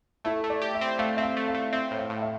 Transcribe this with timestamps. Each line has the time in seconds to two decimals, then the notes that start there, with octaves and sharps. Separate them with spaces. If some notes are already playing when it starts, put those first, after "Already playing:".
0.25 A3 E4
0.44 A3
0.50 D5
0.62 G4
0.75 E5
0.81 C4
0.99 A3 F5
1.17 C4 E5
1.23 F5
1.37 A3
1.48 F5
1.55 A3
1.73 C4 E5
1.91 A2
1.98 F5
2.10 A2
2.22 E5